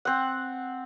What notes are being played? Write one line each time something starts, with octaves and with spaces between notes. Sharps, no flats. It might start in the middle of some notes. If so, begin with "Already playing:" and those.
C4 F#5